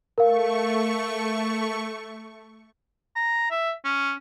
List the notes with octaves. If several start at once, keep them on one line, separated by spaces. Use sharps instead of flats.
A3 A#4 F5 C#6
A#5
E5
C#4